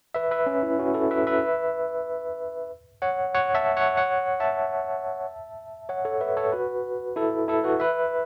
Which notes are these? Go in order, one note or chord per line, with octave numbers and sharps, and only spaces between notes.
B4 E5
B4 E5
C#4
E4
C#4 F#4
E4 A4
B4 E5
B4 E5
C#5 F#5
C#5 F#5
E5 A5
C#5 F#5
C#5 F#5
E5 A5
C#5 F#5
A4 C#5
B4 E5
A4 C#5
F#4 B4
E4 A4
E4 A4
F#4 B4
B4 E5